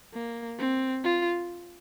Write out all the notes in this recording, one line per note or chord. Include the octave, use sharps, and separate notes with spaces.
A#3
C4
F4